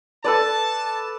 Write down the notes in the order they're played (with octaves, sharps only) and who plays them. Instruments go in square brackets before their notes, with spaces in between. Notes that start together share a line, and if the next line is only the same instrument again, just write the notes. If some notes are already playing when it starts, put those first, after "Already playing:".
[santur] A4 B4 D5 [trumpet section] A5